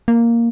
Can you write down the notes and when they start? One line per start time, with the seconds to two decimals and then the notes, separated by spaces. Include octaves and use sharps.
0.08 A#3